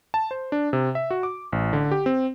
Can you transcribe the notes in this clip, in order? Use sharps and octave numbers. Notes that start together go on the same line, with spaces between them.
A5
C5
D4
C3
E5
F#4
D6
A1
D3
G4
C4